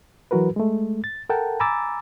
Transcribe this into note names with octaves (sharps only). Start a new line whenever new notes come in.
E3 F#3 F#4 A#4 B4
G#3 A3
A6
A4 A#4 F#5 G5 A5
G#5 A#5 B5 D6 E6 A6